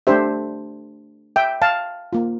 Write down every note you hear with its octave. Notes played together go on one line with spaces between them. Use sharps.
A3 D4 G4 C5 E5
E5 G5
F5 A5
A#3 F4